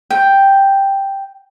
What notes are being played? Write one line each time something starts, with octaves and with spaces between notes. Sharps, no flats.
G5